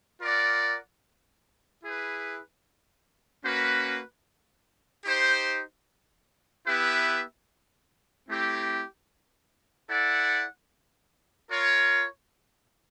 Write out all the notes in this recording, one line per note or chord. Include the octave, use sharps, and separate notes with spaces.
F4 A#4 D5 F#5
E4 G#4 B4
A#3 C#4 F#4 B4
D#4 G4 C5
B3 E4 G4 B4 E5
A3 C4 E4 G4
E4 A4 D5 F#5
F4 A#4 C#5